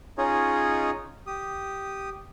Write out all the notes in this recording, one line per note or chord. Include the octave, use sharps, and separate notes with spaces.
C#4 D#4 F4 G#4 C#5 D#5
G4 D#6